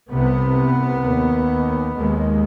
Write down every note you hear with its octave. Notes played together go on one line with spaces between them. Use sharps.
C2 C3 B3
D#2
D#2 G#3